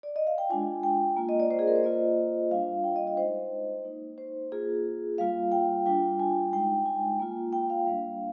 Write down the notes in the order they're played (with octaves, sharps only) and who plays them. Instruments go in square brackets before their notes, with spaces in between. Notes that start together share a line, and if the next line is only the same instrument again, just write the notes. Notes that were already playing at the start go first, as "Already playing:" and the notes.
[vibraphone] D5
D#5
F5
G5
G#3 D4 F4 G#5
G5
A#3 F4
D#5
D5
C5
G#4
A#4
C5
A#3 F4 D#5
G3 D4 F4 F5
G5
D#5
D#5
G#3 D#4 C5
A#3 D#4
C5
A#3 F4 G#4
G3 A#3 F4 F5
G5
G3 D4 F4 G5
G#5
G#3 D#4 G5
G#5
A#3 F4
G5
F5
G3 A#3 D4 F5